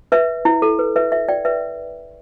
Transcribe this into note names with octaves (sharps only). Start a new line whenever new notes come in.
B4 E5
E4
A4
B4
B4 E5
B4 E5
D5 G5
B4 E5